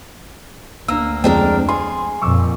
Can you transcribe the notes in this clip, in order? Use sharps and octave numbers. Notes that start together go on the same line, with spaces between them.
D2 A#3 D4 E6
F2 F3 G#3 C4 D4 A#4
G#4 C6
F2 A#2 C#6 D6 E6